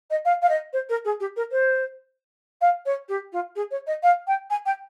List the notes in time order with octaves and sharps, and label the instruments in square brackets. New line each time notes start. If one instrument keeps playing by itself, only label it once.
[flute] D#5
F5
F5
D#5
C5
A#4
G#4
G4
A#4
C5
F5
C#5
G4
F4
G#4
C#5
D#5
F5
G5
G#5
G5